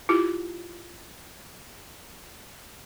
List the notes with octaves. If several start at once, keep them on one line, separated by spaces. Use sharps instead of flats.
E4 F4 G4